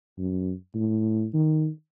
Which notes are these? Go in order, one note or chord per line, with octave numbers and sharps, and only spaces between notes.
F#2
A2
D#3